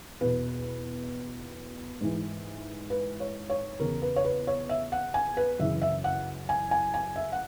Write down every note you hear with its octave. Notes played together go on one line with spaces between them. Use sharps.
E2 B2 B4
G#2 E3
B4
C#5
C#5
E2 C#3 E3 A#4
B4
C#5
B4
C#5
E5
F#5
G#5
B4
F#2 C#3 E3 E5
E5
F#5
G#5
G#5
G#5
E5
F#5